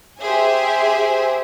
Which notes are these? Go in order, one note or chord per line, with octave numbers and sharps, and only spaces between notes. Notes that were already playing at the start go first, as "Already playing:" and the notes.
G4 G#4 C5 E5 G#5